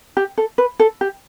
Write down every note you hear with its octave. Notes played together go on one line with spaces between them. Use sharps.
G4
A4
B4
A4
G4